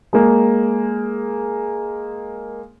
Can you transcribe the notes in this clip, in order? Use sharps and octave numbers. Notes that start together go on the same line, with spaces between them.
G#3 A#3